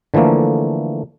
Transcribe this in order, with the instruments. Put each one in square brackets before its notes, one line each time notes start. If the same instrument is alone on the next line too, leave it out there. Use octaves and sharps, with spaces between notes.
[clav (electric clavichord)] D3 E3 F3 A3 A#3